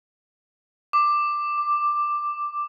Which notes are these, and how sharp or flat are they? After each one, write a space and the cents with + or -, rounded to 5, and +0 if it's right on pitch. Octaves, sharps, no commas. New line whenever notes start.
D6 +10
D6 +0